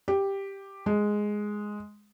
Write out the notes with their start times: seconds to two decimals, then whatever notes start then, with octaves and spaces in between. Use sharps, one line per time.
0.08 G4
0.86 G#3